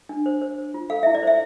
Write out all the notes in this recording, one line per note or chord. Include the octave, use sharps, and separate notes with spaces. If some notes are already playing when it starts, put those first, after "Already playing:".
D4
C5
C5
C5
F4
A4 F5
E4 E5
D5
C5 E5